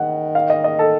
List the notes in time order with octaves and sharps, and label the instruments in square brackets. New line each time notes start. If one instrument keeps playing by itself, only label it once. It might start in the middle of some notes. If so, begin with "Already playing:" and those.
Already playing: [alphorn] D#3 [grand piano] F#5
[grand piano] F5
D#5
D#5
A4